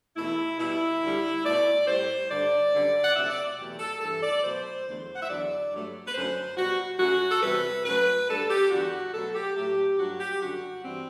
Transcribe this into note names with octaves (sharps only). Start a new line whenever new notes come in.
E2 B2 A3 E4
B2 G3 E4
D2 D3 G3
B2 A3 D5
A2 G3 C5
G2 D3 G3 D5
F#2 D3 G3
F#5
D2 C3 F#3 A3 E5
D5
E2 B2 F#3 A3 G4
A4
G2 E3 A3 A4
D5
B2 F#3 A3 C5
E2 D3 F#3 A3 C5
F#5
E5
E2 D3 F#3 D5
G2 F#3 A3
B4
F#2 D3 F#3 A3 C5
B2 G3 F#4
F#2 F#3 A3 F#4
A4
E2 C3 E3 G3 B4
F#2 F#3 A3 B4
D2 D3 G3 A4
G4
E2 D3 G3 F#4
B2 F#3 A3 A4
G4
A2 F#3 A3 G4
G2 F#3 A3 F#4
G4
F#2 D3 G3 F#4
G2 E3 G3 C4